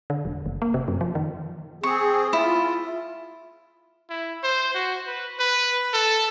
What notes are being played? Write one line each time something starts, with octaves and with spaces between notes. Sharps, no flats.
D3
E1
F#1
A#3
C3
F#2
F3
D#3
C4 G#4 C#6
E4 F4
E4
C5
F#4
B4
B4
A4